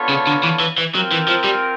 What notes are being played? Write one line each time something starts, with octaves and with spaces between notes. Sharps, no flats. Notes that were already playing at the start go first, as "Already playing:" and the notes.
Already playing: B3 D4 F4 A4 C#5
C#3
D3
E3
E3
E3
F#3 C4 F4 A#4
E3
F3
G3